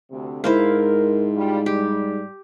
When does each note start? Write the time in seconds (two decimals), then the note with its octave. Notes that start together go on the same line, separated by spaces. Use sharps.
0.10 D2 C3
0.44 G#2 E4 A#4 C5 F5
1.36 G3 F4
1.66 G3 G4